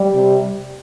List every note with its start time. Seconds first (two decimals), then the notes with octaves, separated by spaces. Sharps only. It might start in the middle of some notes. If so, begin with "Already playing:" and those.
Already playing: G3
0.14 C3